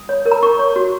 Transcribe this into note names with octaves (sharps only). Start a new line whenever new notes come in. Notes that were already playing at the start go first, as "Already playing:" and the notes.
Already playing: D#6
C#5
A#4
A#5
A#4 C#6
C#5
F#4